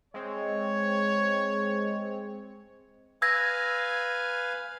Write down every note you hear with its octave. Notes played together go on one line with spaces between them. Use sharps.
G#3 C4 C#5
B4 F5 G#5 E6 G#6 A#6